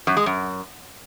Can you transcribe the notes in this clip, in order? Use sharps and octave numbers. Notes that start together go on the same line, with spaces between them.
F#2
G#3
F#2